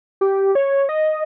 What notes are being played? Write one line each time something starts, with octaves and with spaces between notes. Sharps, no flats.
G4
C#5
D#5